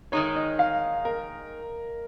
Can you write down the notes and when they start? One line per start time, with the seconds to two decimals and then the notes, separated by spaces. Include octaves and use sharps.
0.12 D#3 G#3 D#4 C#5
0.36 D#5
0.59 F5
1.05 A#4